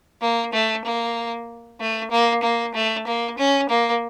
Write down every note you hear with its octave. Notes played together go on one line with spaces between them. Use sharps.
A#3
A3
A#3
A3
A#3
A#3
A3
A#3
C#4
A#3